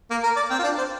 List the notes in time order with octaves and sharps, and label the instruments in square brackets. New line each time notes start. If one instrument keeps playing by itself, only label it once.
[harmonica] A#3
A#4
D5
C4
F4
D4
C5